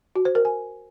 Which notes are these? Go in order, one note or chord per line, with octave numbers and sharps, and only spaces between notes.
F#4
C5
A#4
G#5